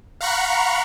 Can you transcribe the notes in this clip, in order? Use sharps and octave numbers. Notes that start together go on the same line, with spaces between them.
F5 F#5 A#5 B5 C#6 F#6